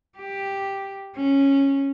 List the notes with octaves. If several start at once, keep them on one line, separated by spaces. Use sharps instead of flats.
G4
C#4